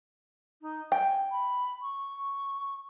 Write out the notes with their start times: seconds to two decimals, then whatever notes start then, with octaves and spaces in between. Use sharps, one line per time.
0.61 D#4
0.92 G5 G#5
1.31 B5
1.82 C#6